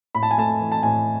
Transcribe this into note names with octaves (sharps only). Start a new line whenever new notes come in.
A2 B5
A5
G#5
A3 A5
E3
A5
A2 G#5